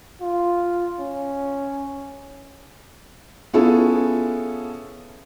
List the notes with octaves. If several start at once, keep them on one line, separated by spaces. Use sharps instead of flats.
F4
C#4
B3 C#4 E4 F4 G#4 A4